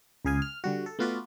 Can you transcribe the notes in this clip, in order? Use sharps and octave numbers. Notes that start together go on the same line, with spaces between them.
C#2 C#3 G#4 F5 G#5
F6
D3 G3 F#4
A4
A3 B3 F4 F#4 B4 D5